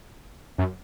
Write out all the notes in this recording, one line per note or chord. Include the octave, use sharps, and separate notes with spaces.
F#2